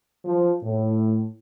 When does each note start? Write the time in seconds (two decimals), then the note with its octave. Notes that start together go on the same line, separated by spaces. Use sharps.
0.25 F3
0.63 A2